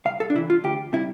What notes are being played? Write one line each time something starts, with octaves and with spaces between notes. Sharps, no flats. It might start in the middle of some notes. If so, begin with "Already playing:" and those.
C2 F5
A4
D4
C3 E3 E4
F4
D2 G4
C3 G3 E4